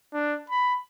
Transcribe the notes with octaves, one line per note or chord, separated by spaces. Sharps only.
D4
B5